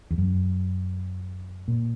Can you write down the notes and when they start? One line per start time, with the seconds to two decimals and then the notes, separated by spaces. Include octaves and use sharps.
0.11 E2
0.18 F#2
1.68 A#2